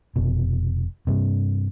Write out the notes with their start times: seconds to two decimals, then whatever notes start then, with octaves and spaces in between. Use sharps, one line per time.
0.16 F1 B2
1.07 G2 C3